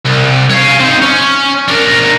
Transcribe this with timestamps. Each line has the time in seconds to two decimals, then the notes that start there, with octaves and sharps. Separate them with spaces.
0.06 C2
0.50 C#5 F5
0.80 C4 D#4
1.02 C#4
1.68 D4 A#4